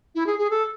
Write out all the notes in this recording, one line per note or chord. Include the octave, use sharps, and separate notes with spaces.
E4
G#4
G#4
A4